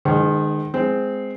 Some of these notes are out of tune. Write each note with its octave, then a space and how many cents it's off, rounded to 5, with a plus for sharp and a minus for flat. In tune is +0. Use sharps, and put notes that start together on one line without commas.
D#3 -35 G#3 +0 C5 -45
G#3 +0 C4 -15